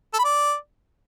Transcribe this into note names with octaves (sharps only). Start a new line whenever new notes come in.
A4
B5
D5